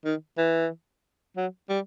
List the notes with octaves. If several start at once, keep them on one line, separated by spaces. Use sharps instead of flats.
D#3
E3
F#3
G3